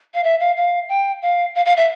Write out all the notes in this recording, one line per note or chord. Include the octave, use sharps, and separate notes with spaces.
F5
E5
F5
F5
G5
F5
F5
F5
E5